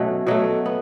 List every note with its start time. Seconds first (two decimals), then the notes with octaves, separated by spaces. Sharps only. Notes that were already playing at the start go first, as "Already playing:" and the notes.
Already playing: B2 F#3 A3 C#4
0.27 B2 F#3 A3
0.66 B3